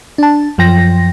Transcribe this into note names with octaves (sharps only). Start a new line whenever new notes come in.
D4 A5
F#2 F3 G5 A#6